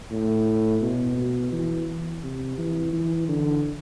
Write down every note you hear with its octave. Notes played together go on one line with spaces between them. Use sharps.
A2
B2
B2
E3
C3
E3
E3
D3